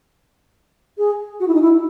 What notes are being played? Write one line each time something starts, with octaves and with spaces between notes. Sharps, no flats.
G#4
F#4
E4
D#4
E4